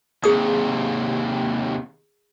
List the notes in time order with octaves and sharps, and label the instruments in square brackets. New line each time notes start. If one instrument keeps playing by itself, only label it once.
[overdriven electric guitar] D#2 C3 [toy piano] G#4 D#6